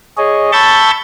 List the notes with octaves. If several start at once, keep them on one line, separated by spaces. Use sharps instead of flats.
G#4 C#5 D#5
A5 B5 C#6 E6 G6 A6